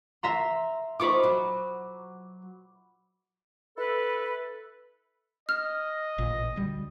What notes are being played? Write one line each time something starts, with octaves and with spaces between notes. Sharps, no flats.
E5 A#5 C6
D#4 F4 C5 B5 C#6 D6
F#3
E4 A4 B4
D#5 F6
A1 A#2
D2 G3